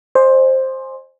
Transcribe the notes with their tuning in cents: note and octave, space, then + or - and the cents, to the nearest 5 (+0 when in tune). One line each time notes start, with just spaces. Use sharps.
C5 +10 D#5 -35 G#5 +0